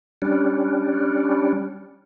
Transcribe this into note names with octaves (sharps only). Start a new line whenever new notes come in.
G3 C#4 D4